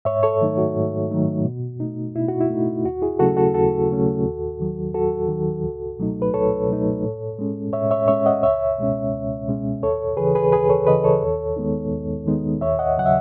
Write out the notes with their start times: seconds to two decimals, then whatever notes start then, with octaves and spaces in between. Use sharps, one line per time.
0.05 G#2 C#5 E5
0.23 A4 C#5
0.41 D#3 F#3 A3 D#4
0.58 F#4
0.76 G#2
1.11 D#3 F#3 A3 D#4
1.45 B2
1.80 A3 D#4
2.16 B2 E4
2.28 F#4
2.41 E4
2.50 A3 D#4
2.85 D#2 F#4
3.02 E4 G#4
3.19 C#3 F#3 A3 C#4 F#4 A4
3.37 F#4 A4
3.54 D#2 F#4 A4
3.90 C#3 F#3 A3 C#4
4.25 D#2
4.60 D#3 F#3
4.94 D#2 F#4 A4
5.29 D#3 F#3
5.63 C#2
5.99 B2 F#3 A3 D#4
6.22 B4
6.34 C#2 A4 C#5
6.68 B2 F#3 A3 D#4
7.03 A2
7.39 G#3 C#4
7.73 A2 C#5 E5
7.91 C#5 E5
8.08 G#3 C#4 C#5 E5
8.26 D#5 F#5
8.42 C#2 C#5 E5
8.78 B2 G#3 C#4
9.13 C#2
9.48 B2 G#3 C#4
9.82 D#2 A4 C#5
10.17 C#3 E3 G#4 B4
10.35 G#4 B4
10.52 D#2 G#4 B4
10.69 A4 C#5
10.87 C#3 E3 B4 D#5
11.04 A4 C#5
11.22 D#2
11.56 D#3 G#3 B3 D#4
11.92 D#2
12.26 D#3 G#3 B3 D#4
12.61 D#2 C#5 E5
12.79 D#5 F#5
12.97 C#3 F#3 F#5
13.06 E5